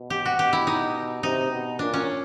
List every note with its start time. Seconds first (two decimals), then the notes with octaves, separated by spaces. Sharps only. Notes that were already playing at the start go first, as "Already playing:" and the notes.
Already playing: B2
0.10 G4
0.26 F#4
0.39 B2 G4
0.53 E4
0.67 D#4
1.23 C3 D#4
1.51 B2
1.79 A#2 D4
1.94 C#4